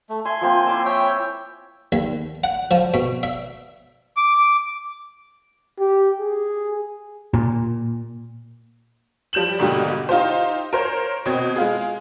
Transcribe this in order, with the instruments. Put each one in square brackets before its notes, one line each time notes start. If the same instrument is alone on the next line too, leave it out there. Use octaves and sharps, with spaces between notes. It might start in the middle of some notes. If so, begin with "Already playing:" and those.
[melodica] A3
[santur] E5 [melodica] G#5 C6
[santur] F3 A#3 C4
E4 D6 E6
[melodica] C#5 E5 G5
[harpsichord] D#2
F#5
F3
B2
E5
[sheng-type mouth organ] D6
[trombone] G4
G#4
[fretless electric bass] A#2
[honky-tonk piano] F3 G3 G6 E7 F#7
G#2 B2 D3 G3 A#3 G4
D#4 F4 G4 C5
A#4 C5 C#5
B2 C4 G#6
G#3 F4 G#4